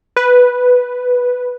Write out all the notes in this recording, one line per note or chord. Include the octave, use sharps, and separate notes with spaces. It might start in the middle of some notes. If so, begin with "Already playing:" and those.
B4